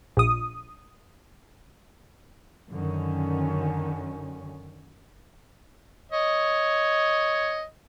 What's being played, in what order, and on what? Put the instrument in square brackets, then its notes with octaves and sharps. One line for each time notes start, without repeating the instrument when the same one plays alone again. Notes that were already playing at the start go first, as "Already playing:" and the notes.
[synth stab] A#1 D#6
[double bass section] F#2 D3 D#3 C#4
[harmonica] C#5 D#5